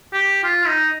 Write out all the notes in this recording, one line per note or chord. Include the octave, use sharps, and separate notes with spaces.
G4
F4
D#4